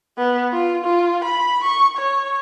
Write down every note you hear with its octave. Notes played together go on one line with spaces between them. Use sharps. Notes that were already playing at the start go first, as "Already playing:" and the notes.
B3
F4
F4
B5
C#6
C#5